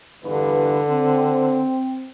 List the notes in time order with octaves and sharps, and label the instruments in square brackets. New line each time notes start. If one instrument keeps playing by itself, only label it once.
[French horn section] E2 G2 B4 [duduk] D3
[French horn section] C4